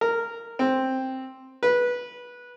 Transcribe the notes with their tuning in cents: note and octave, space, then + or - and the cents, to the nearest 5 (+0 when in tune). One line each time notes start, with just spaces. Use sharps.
A#4 -10
C4 +5
B4 -15